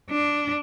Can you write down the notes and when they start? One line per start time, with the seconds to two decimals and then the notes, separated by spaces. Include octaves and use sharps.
0.10 D4